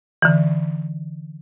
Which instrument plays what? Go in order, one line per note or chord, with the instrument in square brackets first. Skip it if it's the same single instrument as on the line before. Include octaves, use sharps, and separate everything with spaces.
[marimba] D3 E3